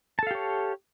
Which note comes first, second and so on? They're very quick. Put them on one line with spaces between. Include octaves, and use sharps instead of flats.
A5 A4 F5 G4 C#5